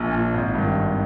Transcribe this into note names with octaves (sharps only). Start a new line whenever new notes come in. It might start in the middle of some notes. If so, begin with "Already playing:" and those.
Already playing: A#1 A#2
A#2
G#1
G2 D#3
G#1